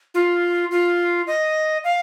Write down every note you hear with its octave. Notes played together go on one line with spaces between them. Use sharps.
F4
F4
D#5
F5